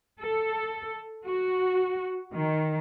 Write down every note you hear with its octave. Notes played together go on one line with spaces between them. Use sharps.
A4
F#4
D#3